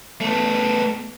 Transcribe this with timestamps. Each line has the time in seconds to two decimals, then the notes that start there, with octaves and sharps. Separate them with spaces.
0.21 A3 B3